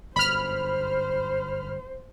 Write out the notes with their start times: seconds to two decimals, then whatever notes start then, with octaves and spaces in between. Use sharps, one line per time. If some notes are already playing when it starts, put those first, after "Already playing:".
0.16 G1 F#2 C5 B5 F6